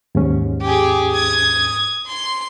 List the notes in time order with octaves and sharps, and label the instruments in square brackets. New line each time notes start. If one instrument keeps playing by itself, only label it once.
[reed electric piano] D#2 G#2 C#4
[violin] G4 G#4
D#6 G#6
C6